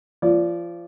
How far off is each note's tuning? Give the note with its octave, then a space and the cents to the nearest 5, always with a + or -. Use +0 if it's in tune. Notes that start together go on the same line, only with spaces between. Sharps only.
F3 -25 D5 -20